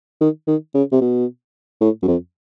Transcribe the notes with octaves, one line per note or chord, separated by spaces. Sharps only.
D#3
D#3
C#3
C3
B2
A2
F#2
F2